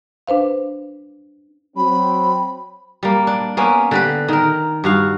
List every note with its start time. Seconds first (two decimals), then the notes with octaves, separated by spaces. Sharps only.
0.27 D4 B4 C5 F5
1.76 F#3 C4 B5
3.03 G3 A#3
3.27 D4
3.57 A#3 B3 C#4
3.91 D3 G4 B4
4.28 D#3 A#4
4.84 G2 F#4 F5